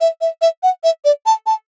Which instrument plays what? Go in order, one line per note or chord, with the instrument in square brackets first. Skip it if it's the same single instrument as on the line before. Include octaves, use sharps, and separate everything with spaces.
[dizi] E5
E5
E5
F#5
E5
D5
A5
A5